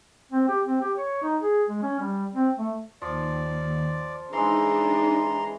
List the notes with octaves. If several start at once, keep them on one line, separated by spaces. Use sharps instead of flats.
C4
G4
C4
G4
C#5
D#4
G#4
G#3
C#4
G3
C4
A3
D#2 F3 D5
E3 G#3 D4 D#4 G#4 A#5 C6